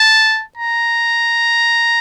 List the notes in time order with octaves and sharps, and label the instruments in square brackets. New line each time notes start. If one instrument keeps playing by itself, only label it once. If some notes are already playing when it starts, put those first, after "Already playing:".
Already playing: [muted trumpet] A5
A#5